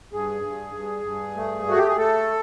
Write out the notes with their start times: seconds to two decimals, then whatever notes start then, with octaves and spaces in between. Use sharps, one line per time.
0.12 G2 G#4
0.43 G2
0.74 G2
1.04 G2
1.36 A3
1.66 A3 F#4
1.78 G4
1.88 G#4
1.97 A3 A4